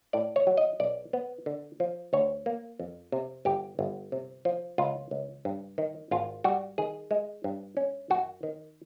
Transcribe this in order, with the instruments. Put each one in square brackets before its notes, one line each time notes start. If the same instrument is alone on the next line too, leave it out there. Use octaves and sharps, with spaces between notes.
[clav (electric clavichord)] A2 D5
C#5
F#3
D#5
B1 D5
B3
D3
F3
D2 C#5
A#3
F2
C3
G1 G4
G1
C3
F3
C#2 F4
C#2
G2
D#3
G#1 F4
G3 F#4
D#3 G#4
G#3
G2
C#4
F#2 F#4
D#3